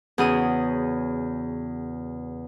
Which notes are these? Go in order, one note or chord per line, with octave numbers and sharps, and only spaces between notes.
E2 C#3 F#4 G#4 D#6